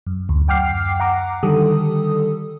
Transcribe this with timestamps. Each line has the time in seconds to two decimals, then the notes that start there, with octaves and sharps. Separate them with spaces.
0.07 F#2
0.29 D2
0.48 F#2 F#5 G5 D6 F6 C7
1.00 F#5 A#5 D6
1.43 D3 D#3 G3 G4 A4 D#6